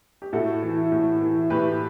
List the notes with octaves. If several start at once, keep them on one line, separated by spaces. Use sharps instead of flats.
G4
A2 F#4 A4
E3
A2
E3
A2 G4 B4